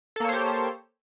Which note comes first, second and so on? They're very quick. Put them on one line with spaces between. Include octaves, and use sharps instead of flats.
A4 A#3 C#5 C5 G4